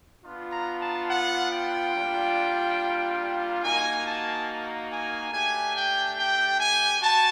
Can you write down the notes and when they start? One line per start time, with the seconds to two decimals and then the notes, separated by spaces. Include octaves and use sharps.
0.25 B3 D4 F4
0.52 A#5
0.80 A5
1.10 F#5
1.51 G5
1.94 G3 A#3 D4 F4
3.63 A#3 D#4 F#4 G#5
4.05 A5
4.89 G#5
5.32 A3 D4 G4 G#5
5.74 G5
6.17 G5
6.59 G#5
7.01 F#4 A5